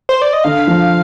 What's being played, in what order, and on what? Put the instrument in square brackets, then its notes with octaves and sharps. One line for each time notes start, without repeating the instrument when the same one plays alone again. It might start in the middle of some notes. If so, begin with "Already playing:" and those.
[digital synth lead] C5
D5
D#5
[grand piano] D3 [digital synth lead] F5
[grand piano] F3